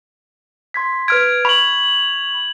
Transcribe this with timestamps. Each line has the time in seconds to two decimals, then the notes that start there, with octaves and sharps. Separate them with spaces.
0.74 C6 G#6 B6
1.08 B4 F6 G#6 D7
1.45 B5 C#6 F7 F#7